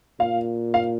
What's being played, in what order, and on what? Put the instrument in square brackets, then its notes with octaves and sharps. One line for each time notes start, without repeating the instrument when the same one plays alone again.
[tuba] A#2 [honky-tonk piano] F5
[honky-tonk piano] F5